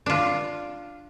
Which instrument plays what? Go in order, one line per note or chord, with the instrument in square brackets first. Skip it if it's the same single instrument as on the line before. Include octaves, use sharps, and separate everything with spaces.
[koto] D4 F4